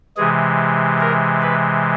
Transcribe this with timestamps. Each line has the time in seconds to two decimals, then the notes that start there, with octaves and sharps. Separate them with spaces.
0.17 C3 E3 G#3 G#4
1.00 A#4
1.42 B4